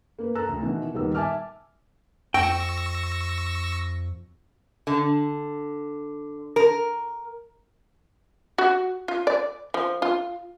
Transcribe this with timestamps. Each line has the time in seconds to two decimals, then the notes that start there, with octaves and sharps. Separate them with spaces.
0.19 A#3 B4
0.35 A4 A#5 E6 F#6
0.49 D2
0.62 B2 D#3 E3
0.94 D#1 D#3 G3 B3 A#4 E6
1.14 E5 G#5 A5 D6 F6
2.34 F2 G5 C#6 E6 A#6
4.87 D3
6.56 A#4
8.58 F#4
9.08 F4
9.27 D5
9.74 F3
10.02 F4